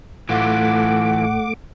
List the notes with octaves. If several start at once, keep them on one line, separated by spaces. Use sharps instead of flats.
A2 E3 A3 F4 F#5 D6